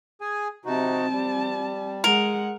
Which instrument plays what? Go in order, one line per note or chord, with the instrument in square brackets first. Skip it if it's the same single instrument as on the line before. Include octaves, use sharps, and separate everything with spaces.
[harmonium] G#4 G#5
[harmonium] C3 D#4 F#4 [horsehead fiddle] C4 A5
[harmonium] G3
[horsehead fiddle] G#3 F#5 [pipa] A#4